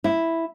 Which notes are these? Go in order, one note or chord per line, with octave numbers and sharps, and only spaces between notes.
E4